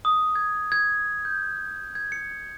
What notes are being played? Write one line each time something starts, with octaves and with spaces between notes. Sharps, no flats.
D#6
G#6
G#6
G6
G#6
C#7